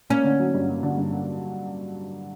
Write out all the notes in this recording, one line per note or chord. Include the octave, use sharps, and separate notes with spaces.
A#3 C#4
D3
F#3
G2
A#3
D3
G2
A#3